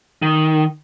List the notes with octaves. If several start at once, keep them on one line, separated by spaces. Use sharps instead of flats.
D#3